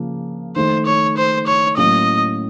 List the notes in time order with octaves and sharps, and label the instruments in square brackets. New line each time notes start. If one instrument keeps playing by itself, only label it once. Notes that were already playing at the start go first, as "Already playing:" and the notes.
Already playing: [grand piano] C#3 F3 A#3
[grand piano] D#3 A3 D#4 [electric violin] C5
[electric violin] C#5
C5
C#5
[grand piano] A2 F#3 A#3 C#4 [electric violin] D#5